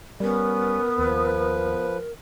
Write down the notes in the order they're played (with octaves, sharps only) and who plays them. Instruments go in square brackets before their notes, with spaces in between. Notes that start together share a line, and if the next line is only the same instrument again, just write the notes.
[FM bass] G3 [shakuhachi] B3 [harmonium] C#4 [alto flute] A#4
[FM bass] D#2 [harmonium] F3 B4